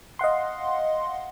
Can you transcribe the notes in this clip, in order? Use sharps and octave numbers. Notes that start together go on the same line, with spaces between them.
D#5 F5 F#5 C6